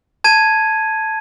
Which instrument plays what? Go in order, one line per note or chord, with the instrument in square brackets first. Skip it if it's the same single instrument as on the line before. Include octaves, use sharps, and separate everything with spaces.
[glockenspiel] A5 G#6 D#7